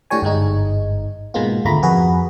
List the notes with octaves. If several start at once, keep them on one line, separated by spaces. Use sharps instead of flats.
A2 D4 G4 C#5 G#5
G1 G#2 G#3 D#4
G#2 B2 G#3 A#3 B3 F4
G#1 D2 A3 F4 A#5 B5
F2 F#4 G#4 A#4 B4